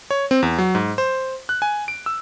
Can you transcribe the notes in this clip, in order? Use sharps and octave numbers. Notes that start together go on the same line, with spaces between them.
C#5
C4
E2
F#3
G#2
C5
F#6
G#5
D7
E6